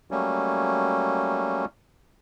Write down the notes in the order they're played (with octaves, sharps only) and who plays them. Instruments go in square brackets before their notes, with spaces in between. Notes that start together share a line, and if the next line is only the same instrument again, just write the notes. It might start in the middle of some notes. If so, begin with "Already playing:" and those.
[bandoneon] F#3 G3 A3 A#3 C#4